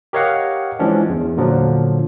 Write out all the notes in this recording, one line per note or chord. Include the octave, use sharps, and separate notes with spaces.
G4 A#4 C#5 D#5 F5 F#5
E3 F3 G#3 C#4 D4
E2
A#2 D3 F3 F#3